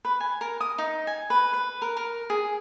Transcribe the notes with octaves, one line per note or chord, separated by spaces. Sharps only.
B4
G#5
A#4
D#6
D#4
G#5
B4
B4
A#4
A#4
G#4